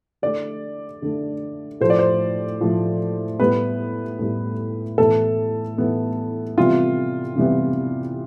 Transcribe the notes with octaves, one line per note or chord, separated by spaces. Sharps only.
D3 A3 D5
D3 A3
A2 F3 A3 C5
D5
C5
A2 F3 A3
A2 G3 B3 B4
A2 G3 B3
A2 E3 B3 A4
A2 E3 B3
C3 E3 G3 B3 F4
C3 E3 G3 B3